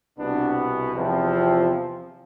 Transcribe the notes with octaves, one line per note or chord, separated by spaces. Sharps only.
C2 B2 B3 D4
E2 C3 F3 C4